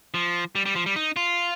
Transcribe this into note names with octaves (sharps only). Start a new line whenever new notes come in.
F3
G3
G3
F3
G3
D#4
F4